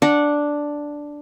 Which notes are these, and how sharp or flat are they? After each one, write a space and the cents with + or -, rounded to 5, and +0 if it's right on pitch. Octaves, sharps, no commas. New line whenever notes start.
D4 +0 F#5 -15